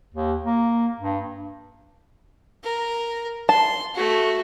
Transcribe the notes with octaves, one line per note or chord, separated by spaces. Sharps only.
D#2
A#3
G2
A#4
A5 C6
A3 F#4